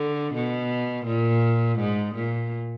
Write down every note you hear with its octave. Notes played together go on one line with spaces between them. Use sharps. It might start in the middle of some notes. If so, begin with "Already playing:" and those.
Already playing: D3
B2
A#2
G#2
A#2